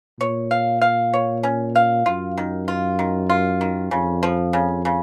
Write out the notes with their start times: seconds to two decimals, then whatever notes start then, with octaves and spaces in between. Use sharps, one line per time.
0.19 A#2 C#5
0.51 F5
0.82 F5
1.14 C#5
1.43 C#4
1.76 F5
2.06 F#2 F4
2.38 D#3
2.68 F4
2.99 D#3
3.30 F4
3.61 D#3
3.91 F2 C#3
4.23 F3
4.53 C#3
4.85 C#3